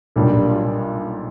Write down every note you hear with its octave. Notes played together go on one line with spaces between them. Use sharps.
B1 A#2 G3 A#3 D4